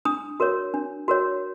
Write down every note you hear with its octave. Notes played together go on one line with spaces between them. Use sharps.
D4 D#6
F#4 A#4 C#5
D4
F#4 A#4 C#5